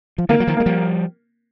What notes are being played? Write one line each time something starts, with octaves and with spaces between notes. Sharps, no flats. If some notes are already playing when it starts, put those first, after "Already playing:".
F3
D3 E3 A#3
F#3
D#3 F3
G#3 A#3
F3 G3